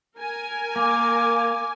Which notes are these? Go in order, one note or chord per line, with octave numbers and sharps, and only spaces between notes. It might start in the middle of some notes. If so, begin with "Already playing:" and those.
A#4 G#5
A#3 D6